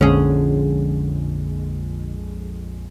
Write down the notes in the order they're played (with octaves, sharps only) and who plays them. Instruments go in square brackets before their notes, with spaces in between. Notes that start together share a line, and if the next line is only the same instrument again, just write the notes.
[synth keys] A#1 F2 G#3 [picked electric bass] D3 [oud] C#4 G#4